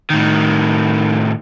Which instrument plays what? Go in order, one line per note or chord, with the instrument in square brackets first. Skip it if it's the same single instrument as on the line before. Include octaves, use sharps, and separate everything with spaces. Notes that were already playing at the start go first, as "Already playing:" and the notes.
[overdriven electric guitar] A2 D#3